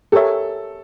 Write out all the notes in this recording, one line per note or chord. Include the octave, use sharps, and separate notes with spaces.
G4 A4 A#4 C#5 E5